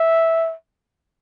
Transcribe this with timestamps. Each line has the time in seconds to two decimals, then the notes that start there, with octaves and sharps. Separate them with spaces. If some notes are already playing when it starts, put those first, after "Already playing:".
Already playing: E5